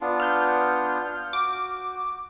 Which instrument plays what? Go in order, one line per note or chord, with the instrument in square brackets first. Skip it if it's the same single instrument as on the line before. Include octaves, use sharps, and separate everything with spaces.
[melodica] B3 D4 F4
[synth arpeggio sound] F6 G6
[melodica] F#4 [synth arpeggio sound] D6